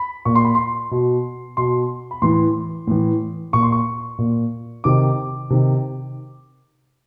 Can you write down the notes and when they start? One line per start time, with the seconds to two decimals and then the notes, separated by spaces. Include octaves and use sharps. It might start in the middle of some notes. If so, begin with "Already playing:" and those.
Already playing: B5
0.25 A#2 C#6
0.35 C6
0.45 B5
0.55 C6
0.91 B2
1.57 B2 C6
2.11 B5
2.22 A2 E3 C6
2.87 A2 E3
3.53 A#2 C#6
3.63 C6
3.72 C#6
4.18 A#2
4.84 C3 D#3 D6
5.50 C3 D#3